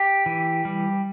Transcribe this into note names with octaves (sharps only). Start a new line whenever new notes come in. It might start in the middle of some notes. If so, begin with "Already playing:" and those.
Already playing: G4
E3
G3